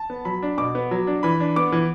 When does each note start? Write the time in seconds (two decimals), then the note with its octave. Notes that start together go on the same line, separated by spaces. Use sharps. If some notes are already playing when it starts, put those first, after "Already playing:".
Already playing: A5
0.10 B3
0.25 F#3 B5
0.43 D4
0.58 B2 D6
0.75 B3
0.91 F#3
1.07 D4
1.23 E3 B5
1.40 D4
1.56 B3 D6
1.72 E3